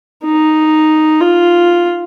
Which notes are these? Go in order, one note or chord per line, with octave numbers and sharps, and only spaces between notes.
D#4
F4